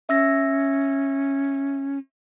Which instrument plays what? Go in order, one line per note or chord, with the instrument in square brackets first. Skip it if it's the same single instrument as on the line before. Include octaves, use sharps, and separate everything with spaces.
[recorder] C#4 [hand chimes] E5 E6 A#6